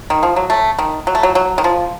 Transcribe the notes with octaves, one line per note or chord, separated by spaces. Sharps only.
D#3
F3
F#3
A3
D#3
F#3
A3
F#3
F#3
D#3
F3